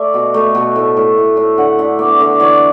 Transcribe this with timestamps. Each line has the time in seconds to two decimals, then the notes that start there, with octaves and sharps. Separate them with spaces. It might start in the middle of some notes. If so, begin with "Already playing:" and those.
Already playing: A3 D5 E5
0.14 B2
0.34 A3
0.55 B2
0.76 A2
0.97 A2
1.17 A2
1.37 A2
1.58 D3 F#5
1.79 D3 E5
1.99 B3 D5
2.20 D3 D5
2.40 E3 C#5